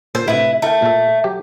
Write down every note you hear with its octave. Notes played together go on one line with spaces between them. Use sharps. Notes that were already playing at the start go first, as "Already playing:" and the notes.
A#2 A4 C5 A5
A2 C3 E4 B4
A3 E4 A#4 G5
A#2 A4
F#3 G4